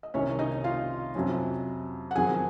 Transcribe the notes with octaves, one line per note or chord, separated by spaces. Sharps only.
D#5
C2 C3 D#3 C#4 C#5
D#4 D#5
F4 F5
F2 C3 F#3 C#4
F#5
F2 D#3 F#3 G#4 G#5